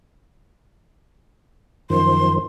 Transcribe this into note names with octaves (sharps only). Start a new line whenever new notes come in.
F#2 D#3 F3 C6